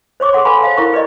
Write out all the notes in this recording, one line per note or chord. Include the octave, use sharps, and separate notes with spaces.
C5 C#5 C#6 D6
G#4 A4 F#5 C6
B4 F5 G#5 A5 B5 C6
C5 F5
E4 A#4 C5 C#6
G4 B4 D5 D#5